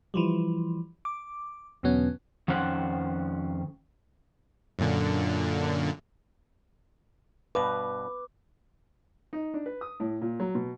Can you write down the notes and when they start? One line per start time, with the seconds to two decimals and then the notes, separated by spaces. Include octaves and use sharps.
0.14 E3 F3 G3
1.05 D6
1.83 E2 B2 D3 F#3 B3 C#4
2.48 F2 D#3 C#4 C5 F#5
4.79 F#2 A#2 D3
7.55 G2 B2 B4 D6
9.33 D#4
9.54 D4
9.66 B4
9.81 D#6
10.00 A2
10.21 A#2
10.40 F#3
10.55 B2